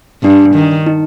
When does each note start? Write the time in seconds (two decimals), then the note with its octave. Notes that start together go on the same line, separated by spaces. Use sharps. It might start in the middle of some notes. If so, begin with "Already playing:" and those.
0.23 G2 D4
0.55 D#3
0.86 D#4